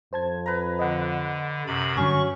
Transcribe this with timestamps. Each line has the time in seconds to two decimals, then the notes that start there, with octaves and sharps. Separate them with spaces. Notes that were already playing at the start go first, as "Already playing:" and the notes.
0.13 F2 C5 A5 G#6
0.46 B4 A#5
0.79 D3 D#5 F#5
1.66 F#2 C3 B5
1.97 G2 D3 F#3 C#4 C#6